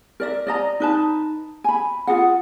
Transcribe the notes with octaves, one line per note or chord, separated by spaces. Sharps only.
A#4 D5 E5
D5 D#5 A#5
D#4 B4 A5
G#5 B5
F4 F#4 G#4 F#5